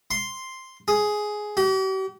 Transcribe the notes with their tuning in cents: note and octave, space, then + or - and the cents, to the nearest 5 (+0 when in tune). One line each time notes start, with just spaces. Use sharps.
C6 +0
G#4 +10
G4 -45